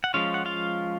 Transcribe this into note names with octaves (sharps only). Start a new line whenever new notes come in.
F#5
F3 G#3 C#4 F4 F5
F#5
F4 F5